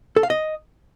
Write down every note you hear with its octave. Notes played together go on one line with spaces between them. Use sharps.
A4
F5
D#5